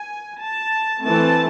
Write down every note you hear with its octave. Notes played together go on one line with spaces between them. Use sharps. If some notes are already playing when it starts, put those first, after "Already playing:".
Already playing: G#5
A5
E3 A3 C4 A5